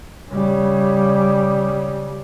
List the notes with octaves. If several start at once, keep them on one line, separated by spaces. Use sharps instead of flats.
C#3 G3